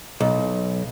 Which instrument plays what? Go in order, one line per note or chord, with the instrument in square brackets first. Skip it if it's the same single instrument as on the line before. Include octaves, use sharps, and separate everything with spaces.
[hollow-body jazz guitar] B1